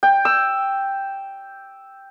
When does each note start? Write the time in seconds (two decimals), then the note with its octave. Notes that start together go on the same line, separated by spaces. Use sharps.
0.03 G5
0.25 E6